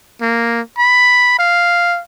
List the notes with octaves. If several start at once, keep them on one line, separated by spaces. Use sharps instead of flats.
A#3
B5
F5